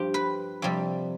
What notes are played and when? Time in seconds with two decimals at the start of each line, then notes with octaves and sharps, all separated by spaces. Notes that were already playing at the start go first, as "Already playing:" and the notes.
Already playing: G2 F3 F4 G4
0.14 B4
0.62 F2 C3 G3